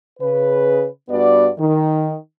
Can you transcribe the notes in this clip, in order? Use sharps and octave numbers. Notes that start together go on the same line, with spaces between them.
C#3 B4
G2 B3 F#4 D5
D#3